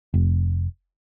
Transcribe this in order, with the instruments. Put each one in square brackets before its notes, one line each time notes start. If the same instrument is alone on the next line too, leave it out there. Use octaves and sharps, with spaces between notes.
[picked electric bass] F1